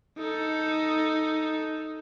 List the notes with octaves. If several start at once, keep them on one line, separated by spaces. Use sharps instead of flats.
D#4 A4